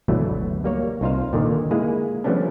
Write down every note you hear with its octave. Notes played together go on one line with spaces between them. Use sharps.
G1 D2 B2 E3 F#3 A3
G3 A#3 C#5
C2 D#4 F4 C5 F5
A#2 D3 D#3
G#3 A#3 E4 G#4
F3 G3 A3 B3 C#4 D4